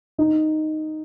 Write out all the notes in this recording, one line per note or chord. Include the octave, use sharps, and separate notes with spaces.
D#4